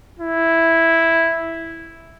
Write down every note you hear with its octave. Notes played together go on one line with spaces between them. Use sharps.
E4